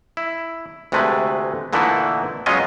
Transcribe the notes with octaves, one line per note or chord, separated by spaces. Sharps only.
E4
D2 C3 G#3 A3 B4
A#2 D3 E3 A3 D#4 E4
F#3 G#3 B3 C#4 F4 D#5